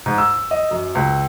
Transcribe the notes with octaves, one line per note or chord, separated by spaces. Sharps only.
G#2
E6
D#5
F#2
C#2